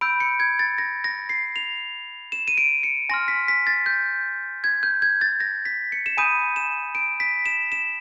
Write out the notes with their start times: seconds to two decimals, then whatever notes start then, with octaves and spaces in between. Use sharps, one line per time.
0.01 B5 E6 G6 D7
0.20 C#7
0.40 G#6
0.59 A6
0.78 A#6
1.04 A#6
1.29 C7
1.56 F7
2.32 E7
2.48 D#7
2.58 D7
2.83 C#7
3.09 G#5 C6 F6 A#6
3.28 B6
3.48 B6
3.67 A6
3.86 G6
4.64 G#6
4.83 G6
5.02 G#6
5.21 A6
5.40 A#6
5.65 B6
5.92 C#7
6.06 E7
6.17 G#5 B5 D#6 G6 D#7
6.56 E7
6.95 D7
7.20 B6
7.46 E7
7.72 E7